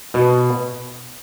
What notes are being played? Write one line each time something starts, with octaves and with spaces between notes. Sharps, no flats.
B2